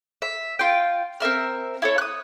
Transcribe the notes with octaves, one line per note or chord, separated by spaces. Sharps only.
E5
F4 G5
C4 A#4 E5 F6
E4 A4 C#5
D#6 F#6